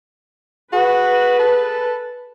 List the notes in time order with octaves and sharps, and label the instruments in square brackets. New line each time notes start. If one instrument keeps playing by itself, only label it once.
[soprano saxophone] F#4 [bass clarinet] G#4 [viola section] B4
[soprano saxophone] A4